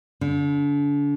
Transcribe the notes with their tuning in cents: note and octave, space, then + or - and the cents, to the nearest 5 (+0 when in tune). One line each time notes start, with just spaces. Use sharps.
D3 -35